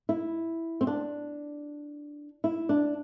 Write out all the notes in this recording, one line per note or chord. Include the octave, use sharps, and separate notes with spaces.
E4
C4
D4
E4
D4